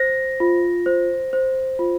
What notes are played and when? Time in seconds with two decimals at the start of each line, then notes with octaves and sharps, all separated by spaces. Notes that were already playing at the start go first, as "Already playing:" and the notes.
Already playing: C5 A#6
0.40 F4
0.86 C5
1.33 C5
1.79 F4